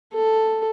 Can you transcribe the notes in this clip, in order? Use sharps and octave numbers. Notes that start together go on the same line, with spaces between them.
A4